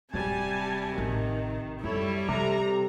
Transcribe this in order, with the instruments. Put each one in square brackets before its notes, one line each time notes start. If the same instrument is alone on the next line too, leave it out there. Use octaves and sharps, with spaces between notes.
[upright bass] D1 [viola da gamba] C3 [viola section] G3 G#5 A5
[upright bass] A1 [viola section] D#3
[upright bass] F#2 [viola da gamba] G3 [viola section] E4 A4 C#5
[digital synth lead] C3 [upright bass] E3 [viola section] A4 A#5